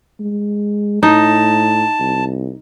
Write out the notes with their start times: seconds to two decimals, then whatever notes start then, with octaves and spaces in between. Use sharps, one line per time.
0.20 G#3
1.03 A2 D#4 A5
2.00 C2